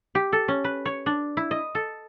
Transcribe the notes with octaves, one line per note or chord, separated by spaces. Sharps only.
G4
A4
C#4
B4
C#5
D4
E4
D#5
A4